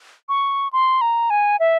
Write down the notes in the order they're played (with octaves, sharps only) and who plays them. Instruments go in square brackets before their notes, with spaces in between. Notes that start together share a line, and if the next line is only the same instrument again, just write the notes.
[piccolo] C#6
C6
A#5
G#5
E5